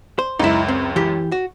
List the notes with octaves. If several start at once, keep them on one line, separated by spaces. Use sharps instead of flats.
C5
C#2 F#2 D#4 E4
C4
E3 G4
F#4